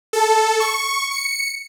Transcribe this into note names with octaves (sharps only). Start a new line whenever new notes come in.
A4
C#6
C#7